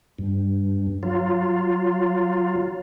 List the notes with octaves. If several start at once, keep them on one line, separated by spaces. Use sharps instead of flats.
G2
F#3 F4